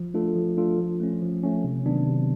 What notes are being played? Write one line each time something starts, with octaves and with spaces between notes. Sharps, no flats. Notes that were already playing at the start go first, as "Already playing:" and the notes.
Already playing: F3
A3 D4 F4 A4
F3
A3 D4 F4 A4
F3
A3 C#4
F3
A3 C#4
C3
D#3 F#3 B3 D4
C3